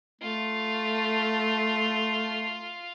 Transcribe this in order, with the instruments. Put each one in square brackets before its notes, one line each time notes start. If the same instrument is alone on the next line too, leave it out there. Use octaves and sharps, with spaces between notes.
[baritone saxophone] A3 [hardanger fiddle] F4